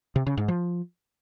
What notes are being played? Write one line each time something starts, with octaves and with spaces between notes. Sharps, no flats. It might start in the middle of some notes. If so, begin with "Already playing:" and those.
C3
C#3
G#2
F3